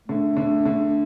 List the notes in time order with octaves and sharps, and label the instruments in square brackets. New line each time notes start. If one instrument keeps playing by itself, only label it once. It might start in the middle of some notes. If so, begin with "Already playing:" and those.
[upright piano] D3 [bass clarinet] A3
[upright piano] D3
D3